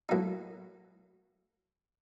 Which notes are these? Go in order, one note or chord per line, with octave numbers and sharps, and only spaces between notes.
A2 F#3 A#3 D#4